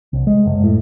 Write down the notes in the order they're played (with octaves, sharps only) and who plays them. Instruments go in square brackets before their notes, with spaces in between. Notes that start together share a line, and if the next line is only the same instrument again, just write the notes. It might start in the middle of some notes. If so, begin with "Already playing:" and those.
[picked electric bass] C2
G#3
F#1
A2